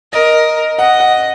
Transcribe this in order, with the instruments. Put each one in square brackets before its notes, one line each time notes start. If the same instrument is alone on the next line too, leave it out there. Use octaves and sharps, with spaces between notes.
[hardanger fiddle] A#4 [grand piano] D#5
[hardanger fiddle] D#5 [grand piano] F#5
[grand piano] F#5